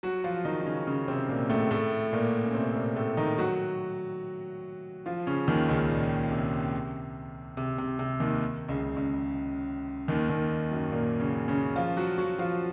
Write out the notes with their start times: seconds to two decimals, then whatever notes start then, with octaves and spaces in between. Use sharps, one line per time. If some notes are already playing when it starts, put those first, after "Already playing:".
0.03 F#3 F#4
0.24 F3 F4
0.45 D#3 D#4
0.61 D#4
0.66 C#3 C#4
0.87 C#3 C#4
1.08 C3 C4
1.29 A#2 A#3
1.49 A2 A3
1.71 A2 A3
2.13 A#2 A#3
2.44 C#4
2.54 C3 C4
2.76 A#2 A#3
2.96 A2 A3
3.17 D#3 D#4
3.38 F#3 F#4
5.06 F3 F4
5.27 C#3 C#4
5.48 D#2 D#3
5.69 C#2 C#3
5.90 A#2
6.32 C3
7.57 C3
7.78 C3
7.99 C3
8.20 D#2 D#3
8.69 C#2 C#3
8.96 C#2 C#3
10.08 D#2 D#3
10.29 D#2 D#3
10.71 F#2 F#3
10.92 A#2 A#3
11.20 C#3 C#4
11.48 C#3 C#4
11.76 F3 F4
11.97 F#3 F#4
12.18 F#3 F#4
12.39 F3 F4